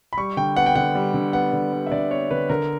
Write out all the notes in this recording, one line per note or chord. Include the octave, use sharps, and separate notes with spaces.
B5
G3 C#6
D3 G5
B3 F#5
G5
D3 F#5
G3
D3
B3 F#5
D3
G3
E5
D3 D5
B3 C#5
D3 B4
D3 A#4